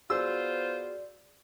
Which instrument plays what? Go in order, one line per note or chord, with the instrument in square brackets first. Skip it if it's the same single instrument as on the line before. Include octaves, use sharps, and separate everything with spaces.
[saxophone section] B3 F4 C5 [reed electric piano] F#4 G#4 [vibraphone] D5 [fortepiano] E6